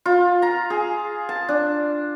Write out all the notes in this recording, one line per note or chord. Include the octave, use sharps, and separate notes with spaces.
F4
A#5
G#4
A5
D4